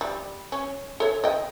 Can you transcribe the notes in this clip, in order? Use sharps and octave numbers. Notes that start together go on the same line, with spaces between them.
G3
C#4
A4 C#5
D#5 G5